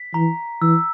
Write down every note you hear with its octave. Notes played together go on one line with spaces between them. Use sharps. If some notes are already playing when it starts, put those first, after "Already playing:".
Already playing: B6
E3 A#5
E3 E6